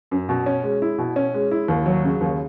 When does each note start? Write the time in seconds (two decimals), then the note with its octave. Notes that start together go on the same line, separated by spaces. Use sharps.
0.11 F#2
0.29 B2
0.46 C#4
0.64 G#3
0.82 E4
0.98 B2
1.16 C#4
1.34 G#3
1.51 E4
1.68 D#2
1.86 F#3
2.04 C#3
2.21 D#2